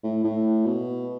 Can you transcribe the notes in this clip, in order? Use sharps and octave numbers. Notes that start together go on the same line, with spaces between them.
A2
A2
B2